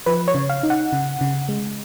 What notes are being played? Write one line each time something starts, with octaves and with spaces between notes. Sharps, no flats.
F3 B4
C#5
C#3
F5
D#4
F#5
C#3
C#3
G#3